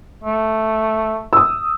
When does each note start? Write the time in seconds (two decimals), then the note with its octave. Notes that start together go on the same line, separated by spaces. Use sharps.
0.24 A3
1.33 D#6 E6